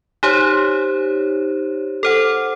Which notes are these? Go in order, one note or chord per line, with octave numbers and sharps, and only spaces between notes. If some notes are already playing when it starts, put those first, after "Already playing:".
D#4 G4 C5 C#5
A4 C5 F#5